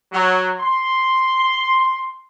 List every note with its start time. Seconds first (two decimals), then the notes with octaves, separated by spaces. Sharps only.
0.13 F#3
0.60 C6